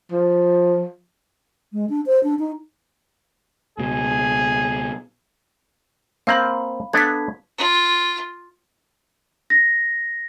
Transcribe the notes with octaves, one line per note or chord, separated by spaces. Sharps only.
F3
G#3
D4
C5
D4
D#4
C#2 B2 G#4
A#3 C4 F5 A#5 B5
B3 D4 A4 G#6 B6
F4
A#6